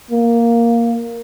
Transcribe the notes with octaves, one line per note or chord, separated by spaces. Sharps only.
A#3